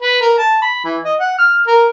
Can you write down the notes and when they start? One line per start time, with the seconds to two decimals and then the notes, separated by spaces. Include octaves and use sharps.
0.01 B4
0.21 A#4
0.38 A5
0.62 B5
0.84 E3
1.05 D#5
1.20 F#5
1.39 F6
1.67 A#4